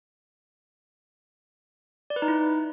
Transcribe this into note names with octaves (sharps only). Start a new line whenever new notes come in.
D5
B4
D#4
E4